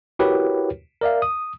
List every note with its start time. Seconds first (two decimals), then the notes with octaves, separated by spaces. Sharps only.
0.19 E4 F#4 G4 A#4 B4 C#5
1.01 A#4 D5 E5 F5
1.22 D#6